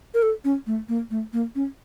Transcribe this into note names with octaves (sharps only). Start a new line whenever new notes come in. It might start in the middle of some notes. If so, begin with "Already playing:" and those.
A#4
A4
C#4
A3
A#3
A3
A#3
C#4